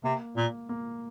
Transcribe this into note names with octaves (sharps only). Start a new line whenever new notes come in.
C3 A#3
A#2 A#3
A#3